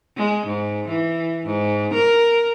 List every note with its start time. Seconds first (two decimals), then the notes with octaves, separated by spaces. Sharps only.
0.17 G#3
0.47 G#2
0.89 E3
1.46 G#2
1.94 A#4